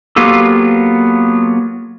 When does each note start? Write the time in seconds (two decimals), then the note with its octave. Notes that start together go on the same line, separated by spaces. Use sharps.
0.16 F#3 A#3 B3 F4 G4 A4